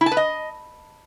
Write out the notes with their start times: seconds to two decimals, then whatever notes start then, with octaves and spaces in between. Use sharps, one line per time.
0.01 E4
0.06 A5
0.11 B4
0.17 D#5